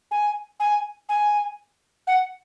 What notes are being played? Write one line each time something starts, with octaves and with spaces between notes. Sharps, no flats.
G#5
G#5
G#5
F#5